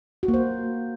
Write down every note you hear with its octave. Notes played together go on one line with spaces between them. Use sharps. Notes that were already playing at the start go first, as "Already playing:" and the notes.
F#4
A#3
C5